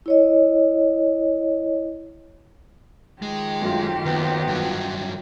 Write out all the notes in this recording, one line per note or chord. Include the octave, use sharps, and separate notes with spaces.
E4 C#5 D#5
D#3 F3 G#3 G4
F#2 A3 F4
D#2 B3
G2 F#3